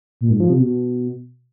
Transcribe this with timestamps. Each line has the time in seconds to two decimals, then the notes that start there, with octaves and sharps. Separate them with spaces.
0.21 A#2
0.30 G#2
0.40 F3
0.50 C3
0.59 B2